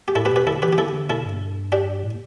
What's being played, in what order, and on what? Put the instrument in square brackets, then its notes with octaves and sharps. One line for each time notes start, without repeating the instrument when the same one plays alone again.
[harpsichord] G4
[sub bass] A2 [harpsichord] E4 A4
[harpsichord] G4 B4
[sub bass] B2
[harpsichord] G4 B4
[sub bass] D3 [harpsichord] E4 A4
[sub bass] E3 [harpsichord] G4 B4
[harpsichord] G4
[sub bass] D3 [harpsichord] E4 A4
[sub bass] B2 [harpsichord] E4 A4
[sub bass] G2
[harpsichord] D4 G4
[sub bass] A2